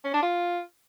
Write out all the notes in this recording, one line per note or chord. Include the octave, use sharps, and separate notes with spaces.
C#4
D4
F4